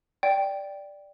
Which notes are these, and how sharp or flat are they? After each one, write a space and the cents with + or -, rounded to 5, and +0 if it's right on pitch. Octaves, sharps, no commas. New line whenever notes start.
D5 +0 G5 +0